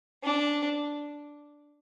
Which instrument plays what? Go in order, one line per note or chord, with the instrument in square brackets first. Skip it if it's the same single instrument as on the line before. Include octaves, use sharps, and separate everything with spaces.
[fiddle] D4